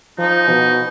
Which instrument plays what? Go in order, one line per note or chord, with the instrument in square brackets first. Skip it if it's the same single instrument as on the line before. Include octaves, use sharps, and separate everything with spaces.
[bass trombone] F3 [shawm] D#4
[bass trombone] B2